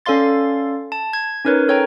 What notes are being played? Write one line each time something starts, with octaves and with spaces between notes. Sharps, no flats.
C#4 A4 D5 F5 C6 A6
A5
G#6
C#4 D#4 A#4 B4 C#5
A4 C#5 G5 A#5